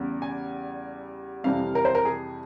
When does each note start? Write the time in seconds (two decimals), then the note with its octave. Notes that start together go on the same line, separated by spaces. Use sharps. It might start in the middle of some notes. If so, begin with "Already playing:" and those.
Already playing: E2 C#3 G3
0.22 G#5
1.44 F2 C3 E3 G3 F5
1.75 A#4
1.85 C5
1.95 A#4
2.05 G#4